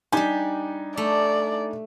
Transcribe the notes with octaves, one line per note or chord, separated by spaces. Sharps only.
G3 D4 D#4 G4 G#5
A3 D5